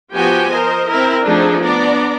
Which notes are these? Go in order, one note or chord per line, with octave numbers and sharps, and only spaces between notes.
F3 B3 F#4 G4 G5 G#5
A#4 C5 D#5
C4 E4 A#4
F3 A3 C4 D4 D#4 G#4
B3 D4 D5 A#5